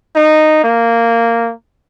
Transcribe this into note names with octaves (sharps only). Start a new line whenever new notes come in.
D#4
A#3